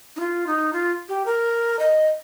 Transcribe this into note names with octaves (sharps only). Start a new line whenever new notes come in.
D#4
F4
D#4
F4
G4
A#4
D#5